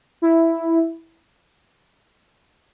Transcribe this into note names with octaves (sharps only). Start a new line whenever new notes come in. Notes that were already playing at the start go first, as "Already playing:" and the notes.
E4